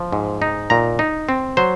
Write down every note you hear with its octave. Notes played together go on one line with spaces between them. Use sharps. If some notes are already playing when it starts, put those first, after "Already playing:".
Already playing: F3
G#2
D#4
A#2 A#5
D#4
C4
F#3 C5